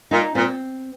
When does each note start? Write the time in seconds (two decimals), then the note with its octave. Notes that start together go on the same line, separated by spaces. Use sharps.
0.11 A#2 D#4
0.35 A#2 C4